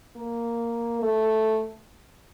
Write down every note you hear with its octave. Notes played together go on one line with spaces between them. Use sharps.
A#3
A3